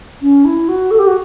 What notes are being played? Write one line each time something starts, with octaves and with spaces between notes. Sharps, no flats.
C#4
E4
F#4
A4
G4
F#4